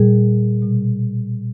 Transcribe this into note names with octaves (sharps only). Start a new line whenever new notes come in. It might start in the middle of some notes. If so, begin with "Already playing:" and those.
Already playing: A#2 G3 G#4
B2 G3